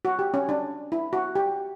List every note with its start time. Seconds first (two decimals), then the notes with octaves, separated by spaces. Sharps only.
0.05 F#4
0.19 G4
0.34 C#4
0.49 D4
0.92 E4
1.13 F#4
1.35 G4